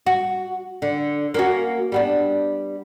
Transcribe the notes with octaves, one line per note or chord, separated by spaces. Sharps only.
F#4
D3
A#3 C#4 F#4
G3 B3 D4